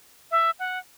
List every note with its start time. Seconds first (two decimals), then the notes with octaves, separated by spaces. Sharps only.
0.31 E5
0.59 F#5